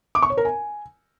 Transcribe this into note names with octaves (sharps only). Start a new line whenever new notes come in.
D6
C#6
C#5
A#4
G#5